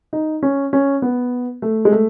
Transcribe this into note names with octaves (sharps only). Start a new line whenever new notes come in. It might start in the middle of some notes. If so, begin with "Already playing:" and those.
D#4
C#4
C#4
B3
A3
G#3
A3